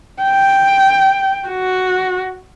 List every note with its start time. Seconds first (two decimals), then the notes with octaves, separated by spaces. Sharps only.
0.22 G5
1.48 F#4